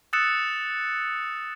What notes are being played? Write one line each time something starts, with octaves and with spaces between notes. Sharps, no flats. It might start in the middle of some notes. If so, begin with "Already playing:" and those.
D#6 E6 F#6 A6 C#7 E7